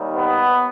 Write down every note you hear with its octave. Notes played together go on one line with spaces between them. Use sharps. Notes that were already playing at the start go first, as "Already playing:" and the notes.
Already playing: D#2 D#3 G3
B3